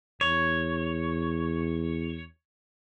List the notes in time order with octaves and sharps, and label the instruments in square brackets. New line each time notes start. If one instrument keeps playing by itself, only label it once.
[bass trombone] E2 [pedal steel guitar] C#5